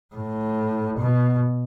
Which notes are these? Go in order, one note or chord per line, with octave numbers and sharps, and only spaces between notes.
A2
B2